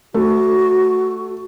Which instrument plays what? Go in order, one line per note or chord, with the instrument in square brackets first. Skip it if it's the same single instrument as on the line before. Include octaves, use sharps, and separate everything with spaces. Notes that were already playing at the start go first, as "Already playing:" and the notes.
[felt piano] A3 [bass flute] F#4